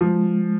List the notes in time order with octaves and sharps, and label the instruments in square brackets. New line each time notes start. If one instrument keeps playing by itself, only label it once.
[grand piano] F3 [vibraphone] G#3